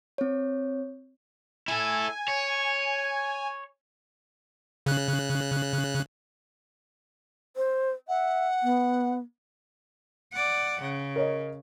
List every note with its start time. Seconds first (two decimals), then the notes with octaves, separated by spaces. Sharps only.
0.18 C4 C#5
1.68 E4 A4 G#5
2.28 C#5
4.86 C#3 F#6
7.57 C5
8.08 E5 F#5
8.63 B3
10.32 D5 F#5
10.82 C#3
11.16 A#4 C#5 D#5